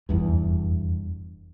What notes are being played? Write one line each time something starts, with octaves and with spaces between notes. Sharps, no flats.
F1 E2 G2